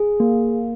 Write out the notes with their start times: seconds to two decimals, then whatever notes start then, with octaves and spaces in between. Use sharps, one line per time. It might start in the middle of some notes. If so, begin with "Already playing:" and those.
Already playing: G#4
0.20 A#3